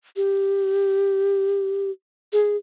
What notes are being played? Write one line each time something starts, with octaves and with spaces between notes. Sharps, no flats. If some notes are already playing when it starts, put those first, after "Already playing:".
G4
G#4